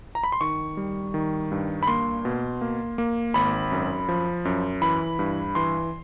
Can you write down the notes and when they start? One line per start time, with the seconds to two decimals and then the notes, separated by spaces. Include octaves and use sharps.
0.15 A#5
0.24 B5
0.32 C6
0.40 D#3 C#6
0.77 G3
1.14 D#3
1.52 G2
1.83 B5
1.87 A#3 C6
2.25 B2
2.61 A#3
2.98 A#3
3.34 G#1 B5
3.72 F#2
4.08 F3
4.45 F#2
4.82 E3 B5
5.19 G2
5.55 E3 C6